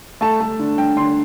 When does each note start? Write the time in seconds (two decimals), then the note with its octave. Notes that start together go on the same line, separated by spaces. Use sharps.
0.21 A3 A5
0.40 A3
0.60 D3
0.78 D3 G5
0.97 D3 C6